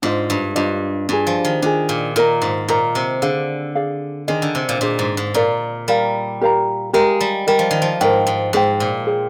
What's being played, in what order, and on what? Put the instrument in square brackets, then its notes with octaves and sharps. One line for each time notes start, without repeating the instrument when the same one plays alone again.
[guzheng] G#2 [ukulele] D4 F4 C5 D#5
[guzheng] G2
[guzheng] G2 [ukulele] D4 F4 C5 D#5
[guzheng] G2 [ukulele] D4 F4 G#4
[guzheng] F3
D#3
[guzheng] D#3 [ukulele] D4 F4 G#4
[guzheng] A#2
[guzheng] A#2 [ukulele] F4 A#4 D#5 A#5
[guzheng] G#2
[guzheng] A#2 [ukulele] F4 A#4 D#5 A#5
[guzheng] C3
[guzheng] D3 [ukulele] G#4 D5 F5
[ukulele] G#4 D5 F5
[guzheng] D#3 [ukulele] D4 G#4 C5 D#5
[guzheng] D3
C3
A#2
[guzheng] A#2 [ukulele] D4 G#4 C5 D#5
[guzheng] G#2
G#2
[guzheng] A#2 [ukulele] A#4 D5 F5 A#5
[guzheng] G3 [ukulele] A#4 D5 F5 A#5
[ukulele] G4 A#4 F5 A#5
[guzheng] G#3 [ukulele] G4 A#4 F5 A#5
[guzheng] G3
[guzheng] G3 [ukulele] A#4 D#5 G5
[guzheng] F3
D#3
F3
[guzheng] G#2 [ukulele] A#4 D#5 G5
[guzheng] G#2
[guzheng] G#2 [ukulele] G#4 C5 G5
[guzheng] A#2
[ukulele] G#4 C5 G5